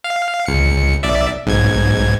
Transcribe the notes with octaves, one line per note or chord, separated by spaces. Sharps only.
F5
C#2 C#7
B1 D5 E5
B1 G#2 G#6